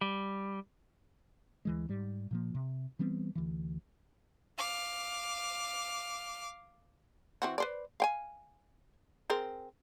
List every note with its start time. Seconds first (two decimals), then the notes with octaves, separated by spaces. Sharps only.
0.01 G3
1.65 D2 E3 G#3
1.89 G#2 G3
2.31 A#2 F3 A#3
2.55 C3
2.99 E3 G3 B3 C4
3.35 D2 E3
4.58 F5 D6
7.42 E3 C4 F#4
7.58 B4 C5 D5
8.00 F5 G5 G#5
9.30 C4 G#4 A#4